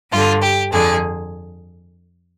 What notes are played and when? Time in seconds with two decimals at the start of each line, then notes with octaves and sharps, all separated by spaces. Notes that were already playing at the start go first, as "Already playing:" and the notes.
0.11 G2 D3 F4
0.42 G4
0.72 F2 D3 G#4